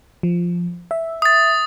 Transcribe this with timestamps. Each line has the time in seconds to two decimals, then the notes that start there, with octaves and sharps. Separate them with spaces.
0.23 F3
0.91 E5
1.22 D#6 A6